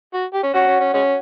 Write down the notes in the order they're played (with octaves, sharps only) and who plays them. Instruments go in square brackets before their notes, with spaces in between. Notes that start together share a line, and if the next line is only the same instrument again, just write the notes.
[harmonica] F#4
G4
C#4
[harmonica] C#4 [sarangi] F#4
[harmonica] C#4
C#4
G#3 C#4